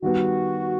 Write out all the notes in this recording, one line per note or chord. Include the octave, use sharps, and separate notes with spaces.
D#3 G3 B3 F#4